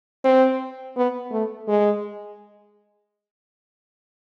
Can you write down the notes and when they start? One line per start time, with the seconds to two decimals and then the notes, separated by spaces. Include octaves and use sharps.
0.24 C4
0.97 B3
1.32 A3
1.68 G#3